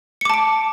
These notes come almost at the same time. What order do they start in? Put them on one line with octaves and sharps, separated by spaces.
C#7 D6 A5 D7